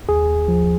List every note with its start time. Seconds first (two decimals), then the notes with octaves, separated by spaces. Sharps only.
0.09 D#2 G#4
0.48 F3